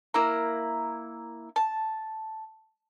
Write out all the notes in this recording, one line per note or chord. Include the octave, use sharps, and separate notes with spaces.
A#3 E4 A#5
A5